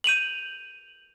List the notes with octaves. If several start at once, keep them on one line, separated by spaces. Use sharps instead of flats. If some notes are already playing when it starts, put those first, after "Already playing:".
G6 D#7 F7 F#7